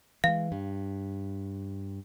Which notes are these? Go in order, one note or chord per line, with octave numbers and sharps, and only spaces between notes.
E3 G#3 F5
G2